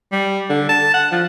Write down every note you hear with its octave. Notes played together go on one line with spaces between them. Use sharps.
G3
D3
A5
F#5
F3